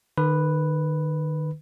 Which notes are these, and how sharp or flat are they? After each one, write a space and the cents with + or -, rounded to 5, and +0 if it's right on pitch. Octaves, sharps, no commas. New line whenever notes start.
D#3 -35 B4 +0